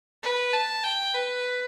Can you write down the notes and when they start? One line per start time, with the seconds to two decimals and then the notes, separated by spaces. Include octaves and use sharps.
0.23 B4
0.53 A5
0.84 G5
1.14 B4